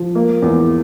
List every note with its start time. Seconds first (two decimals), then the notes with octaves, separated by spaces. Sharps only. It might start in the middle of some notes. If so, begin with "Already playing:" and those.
Already playing: F3
0.15 A#3
0.42 E2